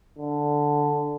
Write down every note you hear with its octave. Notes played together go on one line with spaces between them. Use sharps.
D3